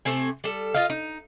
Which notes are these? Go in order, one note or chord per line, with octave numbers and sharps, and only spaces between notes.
C3 A3 C4 G#5
G3 A4
F4 D#5 F5
D#4